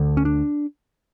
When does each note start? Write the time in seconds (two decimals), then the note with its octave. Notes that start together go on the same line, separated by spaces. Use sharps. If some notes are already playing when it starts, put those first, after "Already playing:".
Already playing: D2 D3
0.17 C#4
0.25 D4